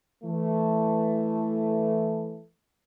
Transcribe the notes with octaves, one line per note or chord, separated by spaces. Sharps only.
E3 A3